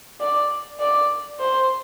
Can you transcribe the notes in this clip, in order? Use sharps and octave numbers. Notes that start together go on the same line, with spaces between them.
D5
D5
C5